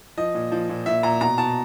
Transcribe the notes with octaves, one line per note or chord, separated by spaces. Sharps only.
F3 D#5
A#2
F3
A#2
A#2 E5
A#2 A#5
B2 A#5
B2 A5